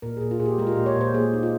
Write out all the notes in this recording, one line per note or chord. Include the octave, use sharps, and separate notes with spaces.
A#2 A#4
A#2 G#4
F4
A#2 G#4
G4
G#3 A#4
F4
A#2 G4
C#5
A#2 C5
A#3 G#4
D#4
F4